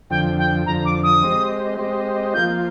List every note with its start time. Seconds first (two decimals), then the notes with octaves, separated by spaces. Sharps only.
0.10 F2 D3 F3 G5
0.38 G5
0.66 F2 D3 F3 A#5
0.85 D6
1.03 D#6
1.23 G#3 C4 G4 C5 D#5
1.78 G#3 C4 G4 C5 D#5
2.34 F3 A#3 F4 G6